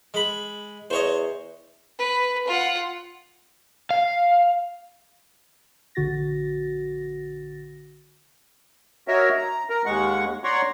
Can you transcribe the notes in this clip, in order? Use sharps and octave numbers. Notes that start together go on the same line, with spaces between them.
G#3 B5
E2 C5 C#5 D#5
B4
F4 F#5
F5
A#1 D3 F#4 A6 A#6
F#4 A#4 C#5 D#5 E5
A#5
A#4 A#5
D#2 G#3 F#5 C#6
C#5 D5 F#5 A#5 C6 C#6